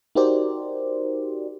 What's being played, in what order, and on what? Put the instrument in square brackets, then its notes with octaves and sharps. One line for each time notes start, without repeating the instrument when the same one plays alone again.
[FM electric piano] D#4 F#4 G4 A#4 C5 D5